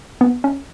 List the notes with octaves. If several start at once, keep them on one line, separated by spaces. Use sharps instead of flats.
B3
C#4